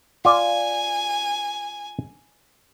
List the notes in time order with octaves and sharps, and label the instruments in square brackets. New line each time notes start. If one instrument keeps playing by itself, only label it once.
[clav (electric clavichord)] F4 D5 [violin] G#5